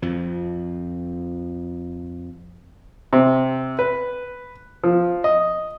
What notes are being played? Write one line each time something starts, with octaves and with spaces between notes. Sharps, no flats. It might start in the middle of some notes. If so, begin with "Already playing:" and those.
F2 F3
C3
B4
F3
D#5